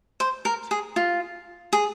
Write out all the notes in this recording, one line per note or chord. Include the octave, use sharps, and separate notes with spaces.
C5
A#4
G#4
F4
G#4